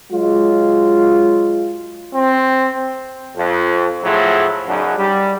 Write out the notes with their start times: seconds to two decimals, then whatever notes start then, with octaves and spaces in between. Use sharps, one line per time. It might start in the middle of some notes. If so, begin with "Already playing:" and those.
0.11 F#3 G#3 F4
2.15 C4
3.36 F2
4.03 A2 F3 F#3 E4 G#4
4.67 F#2 C#3 D4 D#4 F#4
4.97 G3